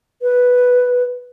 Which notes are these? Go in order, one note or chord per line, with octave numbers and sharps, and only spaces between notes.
B4